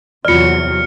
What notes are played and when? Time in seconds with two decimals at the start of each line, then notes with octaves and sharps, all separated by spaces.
0.25 E2 C3 F#3 F4 D5 F6 C#7